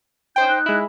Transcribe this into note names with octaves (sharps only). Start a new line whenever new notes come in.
C#4 D#4 C5 G5 G6
D#4 F#6
G#3 E4